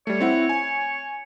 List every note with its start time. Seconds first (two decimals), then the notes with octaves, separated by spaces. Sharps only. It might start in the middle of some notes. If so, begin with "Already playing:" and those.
0.07 G3 A3 C#5
0.20 C4 E4 F#5
0.49 G#5